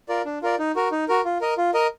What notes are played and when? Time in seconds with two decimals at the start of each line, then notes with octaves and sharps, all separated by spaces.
0.08 F4 A#4 D5
0.25 D4
0.42 F4 A#4 D5
0.59 D#4
0.75 F#4 A#4
0.91 D#4
1.08 F#4 A#4
1.25 F4
1.41 A#4 D#5
1.57 F4
1.74 A#4 D#5